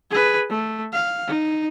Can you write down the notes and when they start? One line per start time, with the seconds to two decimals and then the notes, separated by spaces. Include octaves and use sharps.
0.10 G#4 B4
0.50 A3
0.93 F5
1.27 D#4